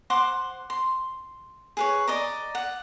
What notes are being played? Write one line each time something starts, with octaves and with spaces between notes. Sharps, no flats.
C5 F#5 C6 D6
C6
G#4 B4 C#5
D5 D#5 A#5
F#5